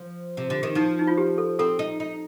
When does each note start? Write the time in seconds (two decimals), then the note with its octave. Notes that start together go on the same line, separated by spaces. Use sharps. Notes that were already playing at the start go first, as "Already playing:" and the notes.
Already playing: F3
0.37 C3
0.50 D3
0.63 D#3
0.75 F3 D#4
0.99 D#4
1.07 F4
1.18 G4
1.38 A4
1.59 C4 A4
1.79 D#4
2.00 D#4